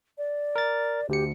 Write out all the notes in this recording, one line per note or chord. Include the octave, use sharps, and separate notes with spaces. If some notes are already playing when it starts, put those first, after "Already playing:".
D5
A#4 A6
D2 G4 C#7